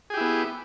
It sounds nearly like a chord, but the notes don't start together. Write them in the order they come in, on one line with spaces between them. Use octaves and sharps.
G#4 G4 E4 B3